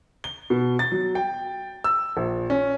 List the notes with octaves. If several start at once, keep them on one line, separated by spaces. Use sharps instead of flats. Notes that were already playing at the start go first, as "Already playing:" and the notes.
G7
B2
A6
F#3
G5
E6
A#1
C#4